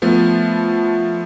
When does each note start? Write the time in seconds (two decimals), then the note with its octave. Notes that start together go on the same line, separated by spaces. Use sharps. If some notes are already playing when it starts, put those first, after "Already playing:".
0.02 F3 A3 B3